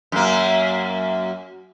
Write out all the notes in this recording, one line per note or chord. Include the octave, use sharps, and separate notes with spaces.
F#2 A#3